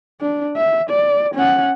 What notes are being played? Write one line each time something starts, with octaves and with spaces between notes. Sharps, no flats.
D4
E5
D5
C#4 F#5